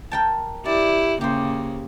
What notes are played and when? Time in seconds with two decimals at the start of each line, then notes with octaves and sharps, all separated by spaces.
0.12 A#4 G5 A5
0.66 E4 G4 D5
1.21 C#3 A#3 G4 C5